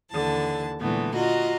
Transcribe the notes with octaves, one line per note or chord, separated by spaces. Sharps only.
D#2 D3 E3 A5
A#2 D3 E3 G#3 A3 B3
F4 F#4 D#5 A#5